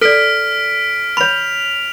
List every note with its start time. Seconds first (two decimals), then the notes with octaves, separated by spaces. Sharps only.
0.01 A4 D5 F6 B6 D7
1.17 C#5 B5 F7